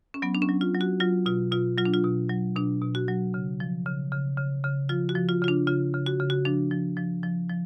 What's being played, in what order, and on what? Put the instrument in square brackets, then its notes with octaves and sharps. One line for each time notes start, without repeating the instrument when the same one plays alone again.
[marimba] C#4
F#3 B3
D4
C#4
F#3
F4
F#3
F#4
F#3 F4
B2 F4
B2 F4
F#3 F4
D4
F4
B2
F#3
B2 D4
B2
F#4
F#3
C#3
F3
C#3
C#3
C#3
C#3
F3 F4
F#4
F3
F4
C#3 F4
D4
C#3 F4
C#3
F#4
C#3
F#4
F3 D4
F3
F3
F3
F3